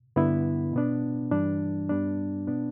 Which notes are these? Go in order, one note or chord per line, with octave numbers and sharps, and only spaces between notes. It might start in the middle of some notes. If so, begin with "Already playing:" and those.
G2 D3 B3 E4
B2 B3 D4
G2 E3 G3 D4
G2 G3 B3 D4
B2 B3 D4